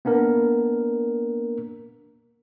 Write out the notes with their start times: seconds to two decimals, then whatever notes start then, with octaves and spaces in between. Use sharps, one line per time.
0.05 A#3 B3 D4 A#4